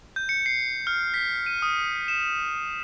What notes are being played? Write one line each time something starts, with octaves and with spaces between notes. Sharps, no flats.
G6
C#7
C7
F6
B6
D#7
D#6
E7